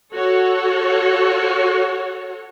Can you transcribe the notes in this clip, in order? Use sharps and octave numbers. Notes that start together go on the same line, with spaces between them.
F#4 A4 C#5